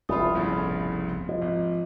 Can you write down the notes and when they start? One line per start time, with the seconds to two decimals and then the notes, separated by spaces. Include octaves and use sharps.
0.09 F1 C2 A3 F4 B5 D#6
0.35 G1 A2 C#3
1.29 F3 D#5
1.42 G#1